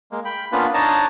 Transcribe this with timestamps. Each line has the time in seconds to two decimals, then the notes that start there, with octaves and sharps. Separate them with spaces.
0.12 G#3 A#3
0.25 G5 B5
0.52 A#3 B3 C#4 D4 F4 B4
0.74 D4 D#4 C#5 D#5 A5 A#5